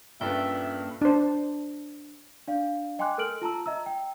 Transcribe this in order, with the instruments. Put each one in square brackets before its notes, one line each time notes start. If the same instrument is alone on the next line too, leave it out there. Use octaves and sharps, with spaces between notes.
[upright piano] G2 B4 [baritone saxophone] A#2 [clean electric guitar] C#4 A4 G5 [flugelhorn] E5
[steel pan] D4 C5
[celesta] D4 D5 F5
D#5 G5 G#5 C6 D6 F#6
A4 A#4 F6 D7 F#7
F4 A5 A#5 E6
D#5 E5 A#5 E6
G5